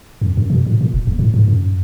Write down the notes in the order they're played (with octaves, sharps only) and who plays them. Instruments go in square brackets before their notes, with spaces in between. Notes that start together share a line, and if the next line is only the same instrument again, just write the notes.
[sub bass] F2
F#2
B2
A2
A#2
E1
D#2
A2
G#2
F#2